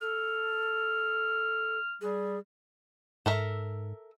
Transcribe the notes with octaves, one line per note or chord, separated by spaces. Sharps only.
A4 F6
G3 G#4
G#2 A4 A#4 E5